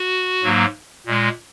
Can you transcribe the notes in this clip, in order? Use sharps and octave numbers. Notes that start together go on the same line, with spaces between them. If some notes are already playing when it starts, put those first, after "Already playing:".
Already playing: F#4
G#2 F#3 A#3
A#2 G#3